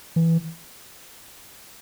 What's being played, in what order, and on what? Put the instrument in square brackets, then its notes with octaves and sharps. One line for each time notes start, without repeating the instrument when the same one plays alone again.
[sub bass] E3